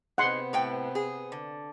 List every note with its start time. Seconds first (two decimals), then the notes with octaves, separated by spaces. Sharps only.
0.18 C3 B3 D#4 G#4 C5 F#5 C6
0.53 A2 B4 G5
0.95 G#4
1.32 D3